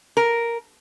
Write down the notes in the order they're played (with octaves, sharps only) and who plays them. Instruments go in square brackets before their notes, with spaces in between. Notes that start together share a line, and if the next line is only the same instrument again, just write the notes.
[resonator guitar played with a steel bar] A#4